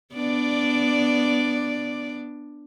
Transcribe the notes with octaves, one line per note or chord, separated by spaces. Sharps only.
B3 D4 D5